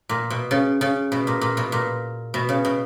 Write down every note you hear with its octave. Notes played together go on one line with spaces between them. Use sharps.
A#2
B2
C#3
C#3
B2
A#2
A#2
B2
A#2
B2
C#3
B2